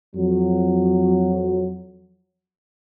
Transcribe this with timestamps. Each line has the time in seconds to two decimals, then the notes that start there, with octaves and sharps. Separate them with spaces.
0.16 F2 F#3